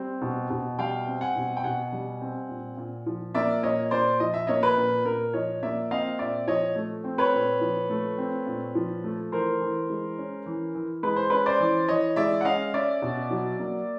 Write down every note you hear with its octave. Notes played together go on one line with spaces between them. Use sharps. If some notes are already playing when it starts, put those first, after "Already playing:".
Already playing: G3 C4
B2
B2
G3 F5 G5
C4
F#5 G#5
B2
G5
B2 F#5 G#5
G3
C4
A#2
A#2
F3
A#3 D5 E5
A#2 C#5 D#5
A#2 C5 D5
F3 D#5
E5
A#3 C#5 D#5
B4
A#2
A#2 A#4
F3 C#5 D#5
A#3 D5 E5
C4 D#5 F5
A#2 D5 E5
F3 C#5 D#5
A3
C4
B4 C#5
A#2
F3
A3
C4
A#2
F3
A3
E3 A#4 C5
E3
G#3
C#4
E3
E3
G#3 B4
C5
C#4 B4
C5 D5
E3
E3 C#5 D#5
G#3 D5 E5
F#5
C#4 D#5 F5
C#4 D5 E5
B2
F#3
A#3